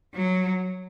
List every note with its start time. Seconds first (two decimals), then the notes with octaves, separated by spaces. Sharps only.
0.14 F#3